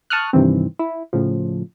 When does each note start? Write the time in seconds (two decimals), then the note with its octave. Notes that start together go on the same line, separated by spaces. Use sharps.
0.10 A5 C#6 D#6 F6 F#6
0.33 G2 C3 D#3 E3 C4
0.79 E4
1.13 A2 C#3 F3